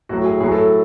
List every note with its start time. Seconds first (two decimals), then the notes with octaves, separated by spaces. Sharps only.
0.09 A2 F#3 F#4
0.25 G#4
0.40 A2 F#3 G#4
0.52 A4